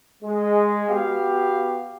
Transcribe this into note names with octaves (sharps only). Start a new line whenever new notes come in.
G#3
B3 F#4 G4 F5